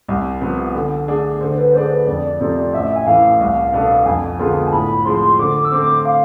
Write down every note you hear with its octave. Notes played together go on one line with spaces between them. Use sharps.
C2
C3 F3 B3
D3
A3 D4 G#4
D3 C5
B4
A3 D4 G#4 C5 D5
B4
F2 D5
C3 F3 A3 C4 D5
A1 E5
G#5
A2 E3 F5
C2
B2 B3 D4 A4
F2 G#5
D3 G#3 B3 F4
A5
A2 B5
F3 G#3 C4 C6
D3 D6
E6
A3 C4 D6
F5